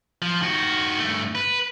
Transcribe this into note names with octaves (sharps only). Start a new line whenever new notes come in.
F3
D#3 F#4
G2 A3
B4